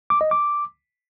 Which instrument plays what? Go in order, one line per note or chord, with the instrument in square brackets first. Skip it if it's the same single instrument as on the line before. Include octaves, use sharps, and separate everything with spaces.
[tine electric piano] D6
D#5
D6